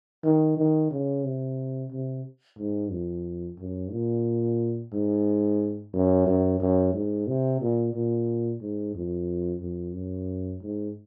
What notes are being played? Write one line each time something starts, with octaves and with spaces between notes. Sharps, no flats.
D#3
D#3
C#3
C3
C3
G#2
F2
F#2
A#2
G#2
F#2
F#2
F#2
G#2
C3
A#2
A#2
G#2
F2
F2
F#2
G#2